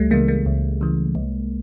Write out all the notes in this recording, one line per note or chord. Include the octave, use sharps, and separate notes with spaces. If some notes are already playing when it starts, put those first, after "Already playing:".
Already playing: C#2 G3 A3
C#3 E3 G#3 A#3
G#3 A#3
C#2
C#3 E3
C2